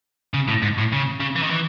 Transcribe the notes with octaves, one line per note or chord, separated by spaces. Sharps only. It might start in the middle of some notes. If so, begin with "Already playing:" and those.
C#3
A2
G#2
A2
C#3
C#3
E3
D#3
E3